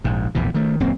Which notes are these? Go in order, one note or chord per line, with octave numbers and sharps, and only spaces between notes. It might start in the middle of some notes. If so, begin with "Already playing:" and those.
A#1 G#2
A#1 E2 A2 C3
D#3 A3
D#1 F#2 A#3 C4